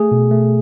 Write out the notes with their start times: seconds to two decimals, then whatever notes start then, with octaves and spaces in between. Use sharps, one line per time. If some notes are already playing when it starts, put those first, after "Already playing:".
Already playing: A3 G#4
0.11 B2
0.31 A3